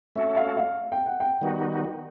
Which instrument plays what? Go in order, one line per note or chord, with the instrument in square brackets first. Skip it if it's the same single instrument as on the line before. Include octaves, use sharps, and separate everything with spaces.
[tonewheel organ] A3 C#4 F#4 A4 [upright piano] E5
[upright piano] F5
F5
G5
F#5
G5
[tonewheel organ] D#3 G3 B3 D#4 F#4